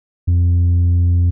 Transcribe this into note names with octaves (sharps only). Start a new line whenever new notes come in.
F2